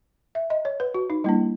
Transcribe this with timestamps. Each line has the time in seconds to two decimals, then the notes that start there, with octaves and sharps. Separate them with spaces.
0.35 E5
0.50 D#5
0.65 C#5
0.80 B4
0.94 F#4
1.10 D#4
1.24 G3 A#3 D4 E4